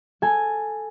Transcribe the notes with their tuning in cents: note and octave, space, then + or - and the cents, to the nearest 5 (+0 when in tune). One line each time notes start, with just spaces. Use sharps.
A4 +0 G#5 +0